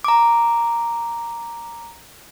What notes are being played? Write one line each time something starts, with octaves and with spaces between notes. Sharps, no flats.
A#5 D6